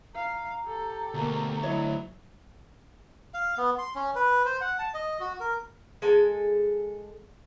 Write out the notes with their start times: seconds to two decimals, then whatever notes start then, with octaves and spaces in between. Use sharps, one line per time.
0.14 F5 A#5
0.65 G4 A4
1.14 D2 B2 A#3
1.63 F#3 A3 E4 C#5 D#5
3.34 F5
3.58 B3
3.78 C6
3.95 C#4
4.15 B4
4.46 C5
4.61 F#5
4.79 A5
4.94 D#5
5.20 F#4
5.40 A#4
6.02 G#3 A4 G#5